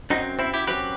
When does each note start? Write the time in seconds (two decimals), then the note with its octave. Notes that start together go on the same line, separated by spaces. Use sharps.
0.10 F#2 F#3 C4 D#4
0.39 C4 E4
0.54 E4 G4
0.67 F#2 F#3 C4 G4 B4